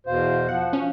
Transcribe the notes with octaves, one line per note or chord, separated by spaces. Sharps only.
E2 B2 C5 F5
F3 F#5
C#4